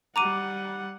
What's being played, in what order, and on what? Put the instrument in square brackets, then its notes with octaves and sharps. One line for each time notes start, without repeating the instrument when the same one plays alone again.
[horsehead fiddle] G3 F#5 [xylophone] A#5 D6 D#7